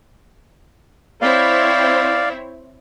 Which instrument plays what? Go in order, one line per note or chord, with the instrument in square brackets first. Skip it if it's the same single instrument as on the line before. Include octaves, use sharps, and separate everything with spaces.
[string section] C4 E4 C#5 [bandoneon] D5 F5